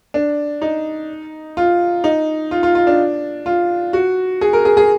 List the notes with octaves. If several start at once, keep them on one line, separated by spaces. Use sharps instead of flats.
D4
D#4
F4
D#4
F4
F4
F4
D4
F4
F#4
G#4
A#4
G#4
G#4